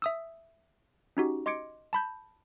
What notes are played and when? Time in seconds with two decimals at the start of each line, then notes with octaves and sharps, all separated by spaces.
0.02 E5 D#6 E6
1.17 C#4 D#4 F#4 G4
1.46 D#5 C6 D6 G#6 C#7 D7
1.93 A5 B5 G6